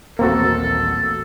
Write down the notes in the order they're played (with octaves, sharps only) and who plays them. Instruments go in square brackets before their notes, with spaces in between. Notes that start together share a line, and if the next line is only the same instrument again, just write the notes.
[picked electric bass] D#1 A1 [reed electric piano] A#3 C4 F#4 [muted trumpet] A4